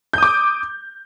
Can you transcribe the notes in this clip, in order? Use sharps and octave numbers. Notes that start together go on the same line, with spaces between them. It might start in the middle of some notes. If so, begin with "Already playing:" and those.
D6 D#6 G6